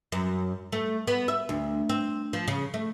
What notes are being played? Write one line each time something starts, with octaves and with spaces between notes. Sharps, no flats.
F#2
A3
B3
E5
D2
C4
F3
C#3
A3